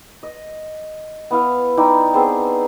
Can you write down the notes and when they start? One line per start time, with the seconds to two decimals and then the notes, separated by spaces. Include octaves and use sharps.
0.23 D#5
1.31 B3 E4 F5
1.77 D#4 E4 D5 G5
2.14 B3 C4 G#4 A4